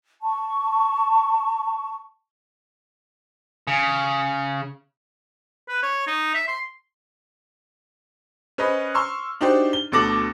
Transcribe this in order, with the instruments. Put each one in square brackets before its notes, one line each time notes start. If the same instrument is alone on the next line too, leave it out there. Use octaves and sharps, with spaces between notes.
[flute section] A5 C#6
[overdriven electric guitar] C#3
[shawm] B4
C#5
D#4
E5
C6
[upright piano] C#4 B4 C5 D#5
C6 C#6 E6 F6
D4 D#4 F#4 G4 C5
G7
D2 B2 A4 D6 A#6 F#7